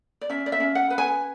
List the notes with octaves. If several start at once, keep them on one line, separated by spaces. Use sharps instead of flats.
D5
C#4 E5
D5
E5
C#4
F#5
B4
G#5